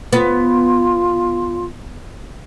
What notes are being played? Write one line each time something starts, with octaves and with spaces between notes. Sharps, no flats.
B3 F4